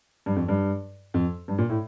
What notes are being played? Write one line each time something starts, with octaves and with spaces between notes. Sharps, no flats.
G2
F2
G2
F2
G2
A#2
A2